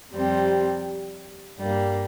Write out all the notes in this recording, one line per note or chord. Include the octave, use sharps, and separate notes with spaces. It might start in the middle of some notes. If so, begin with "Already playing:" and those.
F2 C3 G3 C4
G2 G3 A#3